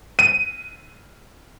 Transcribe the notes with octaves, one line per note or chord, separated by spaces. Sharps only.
D#7